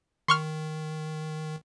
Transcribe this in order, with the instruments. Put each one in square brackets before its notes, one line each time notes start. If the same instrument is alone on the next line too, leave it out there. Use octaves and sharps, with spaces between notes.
[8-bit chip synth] D#3 [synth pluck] C6 C#6 F6